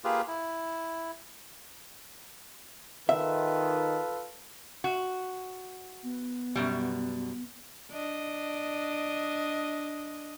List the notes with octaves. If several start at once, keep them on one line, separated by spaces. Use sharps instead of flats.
A#3 F4 G4 G#4 B4
E4
D#3 F4 A4 B4 E5
F#4
B3
F#2 B2 G3
D4 D#5